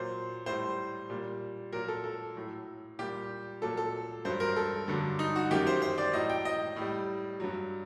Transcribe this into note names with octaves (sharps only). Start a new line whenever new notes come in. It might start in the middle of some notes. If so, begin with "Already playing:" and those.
Already playing: A#2 F#3 C5
A2 G3 C5
A#2 G3
A#2 F#3 A#4
A4
A4
A2 F#3
A#2 G3 G4
A#2 F#3 A4
A4
G2 F#3 C5
A#4
A4
G2 D3 F#3
D#4
F#4
F#2 D#3 F#3 G4
C5
C5
D5
A2 F#3 D#5
G5
D#5
A2
G3
G2 F#3